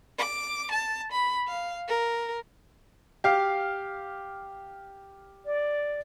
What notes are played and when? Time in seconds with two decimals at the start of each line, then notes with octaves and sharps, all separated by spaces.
0.18 D6
0.72 A5
1.12 B5
1.48 F5
1.88 A#4
3.24 G4 F5
5.45 D5